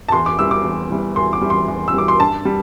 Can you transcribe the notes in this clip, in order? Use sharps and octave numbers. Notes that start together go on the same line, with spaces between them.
A5
E2 C6
D6
E3 G3 E6
D6
E2
E3 G3
E2 C6
D6
E3 G3
C6
E2
E6
E3 G3 D6
C6
G2 A5
G3